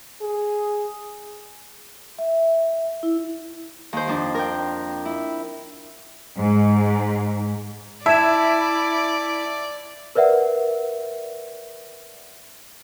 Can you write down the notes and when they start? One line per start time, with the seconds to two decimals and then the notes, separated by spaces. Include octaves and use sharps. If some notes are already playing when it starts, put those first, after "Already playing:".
0.21 G#4
2.19 E5
3.03 E4
3.93 D#2 C5
4.08 F2 D4
4.35 A#4 G5
5.05 E4
6.37 G#2
8.06 E4 D5 E5 A5 G#6 E7
10.15 A#4 B4 D5 E5 F#5